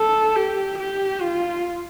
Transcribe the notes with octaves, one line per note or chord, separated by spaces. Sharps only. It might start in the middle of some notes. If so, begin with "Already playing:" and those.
Already playing: A4
G4
G4
F4